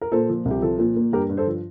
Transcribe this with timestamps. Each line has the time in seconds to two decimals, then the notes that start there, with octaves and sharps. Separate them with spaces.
0.01 A#4
0.12 A#2 A4 C5
0.29 F3
0.45 C2
0.51 G4
0.62 F3 A4
0.79 A#2
0.96 A#3
1.13 G2 G4 A#4
1.29 G2
1.37 A4 C5
1.47 F3